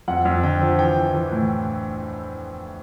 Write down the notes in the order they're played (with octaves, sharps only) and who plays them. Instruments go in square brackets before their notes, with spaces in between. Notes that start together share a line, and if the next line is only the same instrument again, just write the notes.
[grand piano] F2 F#5
F2
D3 G5
F3
E3 G5
E3
E3
A2